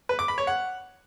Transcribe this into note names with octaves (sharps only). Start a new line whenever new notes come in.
B4
D6
B5
C#5
F#5